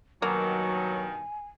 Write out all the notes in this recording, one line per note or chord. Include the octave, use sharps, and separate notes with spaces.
G2 B2 D#3 F#3 A#3 G#5